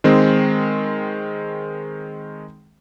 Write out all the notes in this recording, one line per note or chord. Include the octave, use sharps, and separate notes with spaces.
D#3 G#3 C4